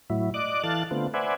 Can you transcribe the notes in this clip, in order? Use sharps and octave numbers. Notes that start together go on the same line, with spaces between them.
A2 F#3 E4
D5 D#5 D6 F#6
E3 A4 F5 F#6 A6
D3 A3 B3 C4 F4
B4 C5 D5 E5 F#5 G#5